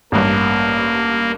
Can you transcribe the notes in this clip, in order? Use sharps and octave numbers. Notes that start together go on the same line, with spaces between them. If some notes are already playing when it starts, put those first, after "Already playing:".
A1 G2 A#3